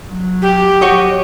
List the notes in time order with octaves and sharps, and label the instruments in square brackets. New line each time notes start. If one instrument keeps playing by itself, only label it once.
[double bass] F#3
[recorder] G4
[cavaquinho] F#4 C#5 D#5